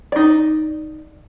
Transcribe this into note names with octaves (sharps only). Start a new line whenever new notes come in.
D#4 D5